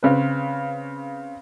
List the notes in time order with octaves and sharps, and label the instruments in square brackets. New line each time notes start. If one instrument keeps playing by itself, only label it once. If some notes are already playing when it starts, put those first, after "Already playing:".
[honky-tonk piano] C#3 C4 B4